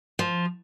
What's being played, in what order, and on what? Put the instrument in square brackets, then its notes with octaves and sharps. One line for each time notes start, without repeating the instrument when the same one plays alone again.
[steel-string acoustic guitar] F3